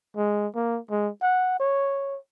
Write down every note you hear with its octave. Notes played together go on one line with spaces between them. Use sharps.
G#3
A#3
G#3
F#5
C#5